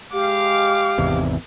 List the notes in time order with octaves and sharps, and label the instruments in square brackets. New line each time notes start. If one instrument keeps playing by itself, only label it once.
[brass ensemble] G#3 F5 [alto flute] G4 [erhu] D6
[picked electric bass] G#1 E2 C3